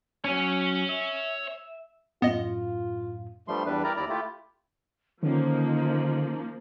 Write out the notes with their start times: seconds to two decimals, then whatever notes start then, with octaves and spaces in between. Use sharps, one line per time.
0.24 F#3 C#4 C#5 G#5
0.89 E5
2.22 F#2 A2 B3 F4 D#5
3.48 G2 F3 G3 A3 C6
3.66 E2 G2 G3 D4 B4
3.84 E4 G4 A#4 D5 A#5
3.96 D#2 E4 D5 A#5
4.09 A3 E4 F4 G4
5.23 D3 D#3 F3 A#3 C#4 D#4